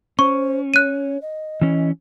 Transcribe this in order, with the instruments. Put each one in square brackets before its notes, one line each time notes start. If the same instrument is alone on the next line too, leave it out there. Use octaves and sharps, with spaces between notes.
[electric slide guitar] C#4 [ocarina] C5 [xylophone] C#6
[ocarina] C#5 [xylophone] F#6 D#7
[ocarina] D#5
[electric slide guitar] E3 C#4